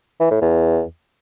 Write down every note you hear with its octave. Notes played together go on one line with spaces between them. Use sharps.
E3
A2
E2